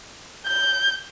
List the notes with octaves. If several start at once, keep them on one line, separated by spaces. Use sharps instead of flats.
G6